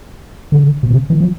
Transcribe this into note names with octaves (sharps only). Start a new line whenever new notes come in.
D3
B2
C3
E3
F3